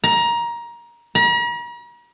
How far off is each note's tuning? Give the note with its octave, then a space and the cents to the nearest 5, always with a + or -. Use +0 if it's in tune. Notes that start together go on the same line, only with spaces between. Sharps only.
A#5 +20
A#5 +45